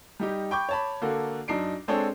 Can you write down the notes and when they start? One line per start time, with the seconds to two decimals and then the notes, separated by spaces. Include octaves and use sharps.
0.20 G3 D#4 G4
0.51 G5 B5 C#6 D6 G6
0.69 C#5 A5 B5
1.02 D3 A#3 F#4 A4
1.48 F#2 D4 D#4 C7 D7
1.88 G#3 C4 D4 G#4 A4 C#5